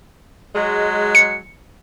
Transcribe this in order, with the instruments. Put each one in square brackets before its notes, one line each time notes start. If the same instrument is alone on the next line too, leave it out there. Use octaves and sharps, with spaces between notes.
[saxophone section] F#3 G#3
[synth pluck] C#7